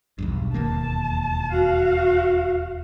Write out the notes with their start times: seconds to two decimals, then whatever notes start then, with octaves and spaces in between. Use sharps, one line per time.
0.18 B1 E2 G2
0.54 E1 D#2 A#3 A5
1.52 F#4 F5